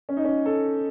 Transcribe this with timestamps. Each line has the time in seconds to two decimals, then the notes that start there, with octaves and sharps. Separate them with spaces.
0.09 C#4
0.17 D#4
0.25 C#4
0.46 A4